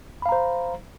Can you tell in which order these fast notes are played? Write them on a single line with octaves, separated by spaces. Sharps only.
B5 F5 A#5 C5